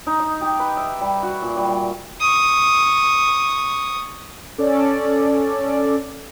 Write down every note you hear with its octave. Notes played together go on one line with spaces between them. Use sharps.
D#4
D#5
G4
B4
E5
G3
F#4
A#2
G3
G3
C#6 D#6
C#4 A4 D5